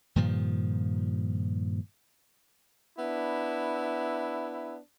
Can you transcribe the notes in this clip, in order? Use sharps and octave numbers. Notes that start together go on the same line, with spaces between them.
G2 A#2 D#3 F3
B3 D4 E4